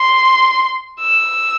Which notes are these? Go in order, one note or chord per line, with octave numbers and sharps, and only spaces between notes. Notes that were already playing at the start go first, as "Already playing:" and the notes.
Already playing: C6
E6